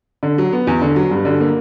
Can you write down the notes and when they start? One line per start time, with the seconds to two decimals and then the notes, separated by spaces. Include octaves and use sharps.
0.23 D3
0.38 F#3
0.53 B3
0.67 E2
0.82 D3
0.96 F#3
1.11 G2
1.25 D3
1.40 A#3